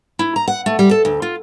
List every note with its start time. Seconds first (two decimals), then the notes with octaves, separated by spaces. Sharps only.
0.19 E4
0.36 A#5
0.48 F#5
0.66 A3
0.79 G3
0.91 A4
1.05 D2
1.22 F4